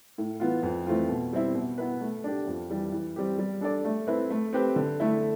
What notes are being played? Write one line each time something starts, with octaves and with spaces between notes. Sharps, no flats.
A2
E3 B3 F4
F2
E3 A3 C4 F4
B2
G3 C4 E4
B2
B3 E4 B4
A3
D4 G4
F2
E3 G3
E3
G3 C4 G4
G3
D4 A4 D5
A3
C4 E4 B4
A3
C4 G4 B4
D3
A3 E4